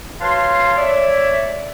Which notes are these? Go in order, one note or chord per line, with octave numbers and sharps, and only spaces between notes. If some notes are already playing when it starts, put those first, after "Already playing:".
F#4 B4 C#5 F5 A5 C6
C#5 D5 E5